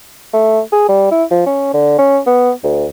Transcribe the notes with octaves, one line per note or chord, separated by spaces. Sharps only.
A3
G#4
G3
E4
F3
C#4
D3
C#4
B3
D2